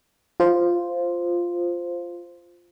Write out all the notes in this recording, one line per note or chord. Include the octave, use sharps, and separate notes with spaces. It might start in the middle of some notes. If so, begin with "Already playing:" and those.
F4 C5